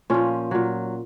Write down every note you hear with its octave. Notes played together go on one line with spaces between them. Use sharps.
A#2 F3 C#4
A#2 F#3